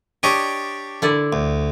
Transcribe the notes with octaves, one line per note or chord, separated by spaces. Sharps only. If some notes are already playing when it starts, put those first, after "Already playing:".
D4 G4 C#5 D#5
D3 E4 D5
D2